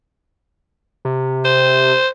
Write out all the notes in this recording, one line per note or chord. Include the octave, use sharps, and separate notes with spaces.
C3
C5